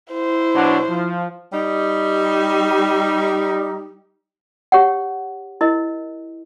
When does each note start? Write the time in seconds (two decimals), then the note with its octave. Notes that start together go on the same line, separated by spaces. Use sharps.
0.13 E4 C5
0.55 B2 F#3 D4
0.90 F3
1.52 G3 D#4
4.72 G4 C#5 F#5
5.61 E4 A#4 D#5